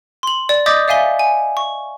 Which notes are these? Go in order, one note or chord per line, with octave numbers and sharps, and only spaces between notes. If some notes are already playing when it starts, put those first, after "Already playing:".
C6 F#7
D5
D#5 D6 D#6 G6 A6 B6
D5 E5 F5 G#5 B6 G7
G#5
C#6